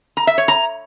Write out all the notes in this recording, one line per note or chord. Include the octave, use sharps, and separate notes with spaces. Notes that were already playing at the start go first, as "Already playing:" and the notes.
A#5
E5
C#5
A#5